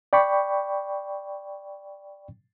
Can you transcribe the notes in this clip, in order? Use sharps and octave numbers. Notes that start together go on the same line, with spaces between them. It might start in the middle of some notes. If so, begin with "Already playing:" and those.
D5 G5 B5 C#6